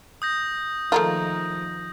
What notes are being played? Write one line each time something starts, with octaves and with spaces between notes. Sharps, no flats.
D#6 G6 A#6
D#3 F3 A3 A#3 F4 G#4 D#5 A#5